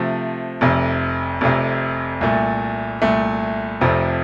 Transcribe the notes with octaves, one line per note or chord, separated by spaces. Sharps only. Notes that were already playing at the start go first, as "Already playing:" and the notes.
Already playing: C3 F3 A3
F1 F2 C3
F1 F2 C3
C2 A#2 A3
C2 A#2 A3
F1 F2 C3 F3 C4